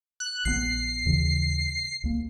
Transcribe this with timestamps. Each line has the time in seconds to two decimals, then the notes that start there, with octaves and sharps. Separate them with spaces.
0.20 F#6
0.45 A#1 D#3 B3 C7
1.06 D#2 C#3 E3
2.04 C#2 A#3